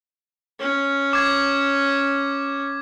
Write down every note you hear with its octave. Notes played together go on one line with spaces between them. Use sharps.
C#4
D6 G#6